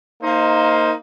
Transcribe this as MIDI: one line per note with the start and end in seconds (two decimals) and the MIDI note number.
0.22 0.91 58
0.22 0.91 63
0.22 0.91 72